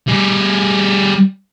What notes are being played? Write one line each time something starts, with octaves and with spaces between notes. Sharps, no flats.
G3 G#4